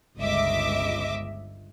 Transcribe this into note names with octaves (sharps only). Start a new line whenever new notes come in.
G1 C#2 D#5 E5 D6